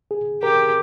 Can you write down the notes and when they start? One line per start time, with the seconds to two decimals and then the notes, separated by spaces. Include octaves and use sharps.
0.11 G#4
0.42 G4 A#4